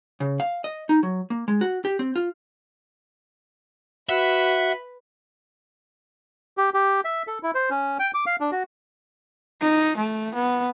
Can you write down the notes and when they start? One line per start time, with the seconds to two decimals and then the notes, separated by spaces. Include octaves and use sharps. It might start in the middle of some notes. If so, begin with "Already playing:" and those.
0.20 C#3
0.40 F5
0.64 D#5
0.89 D#4
1.03 F#3
1.30 A#3
1.48 G#3
1.61 F#4
1.85 G4
1.99 C4
2.16 F4
4.09 F#4 B4 E5 F#5
6.57 G4
6.74 G4
7.05 E5
7.27 A4
7.43 E4
7.55 C5
7.70 C#4
7.99 G5
8.14 D6
8.26 F5
8.41 D4
8.52 F#4
9.61 D#4
9.97 A3
10.34 B3